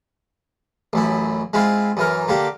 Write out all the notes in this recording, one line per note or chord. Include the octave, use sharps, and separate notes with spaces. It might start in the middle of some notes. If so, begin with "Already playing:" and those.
A1 F#2 E4
G#3 C4 E4 F4
F#2 E3 A#4
D3 A#3 G4